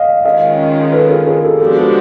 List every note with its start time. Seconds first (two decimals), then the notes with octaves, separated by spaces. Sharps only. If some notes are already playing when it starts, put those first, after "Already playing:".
Already playing: D#5 F5
0.25 D#3 G#3 C#4 F4 D#5 F5
0.92 A4 B4
1.09 G#4 A#4
1.26 G#4 A#4
1.43 G4 A4
1.60 F3 G#3 B3 D4 F#4 G4 A4
1.77 G4 A4